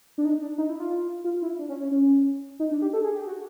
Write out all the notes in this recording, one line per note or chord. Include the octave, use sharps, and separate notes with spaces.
D4
D#4
D4
D#4
E4
F4
F4
E4
D4
C#4
C#4
C#4
D#4
D4
G4
A4
G#4
G4
F#4